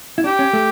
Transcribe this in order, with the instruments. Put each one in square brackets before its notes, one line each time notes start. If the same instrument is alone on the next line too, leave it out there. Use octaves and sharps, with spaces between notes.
[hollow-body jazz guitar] E4
[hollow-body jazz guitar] D4 [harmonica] G4
[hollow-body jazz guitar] C#4
A3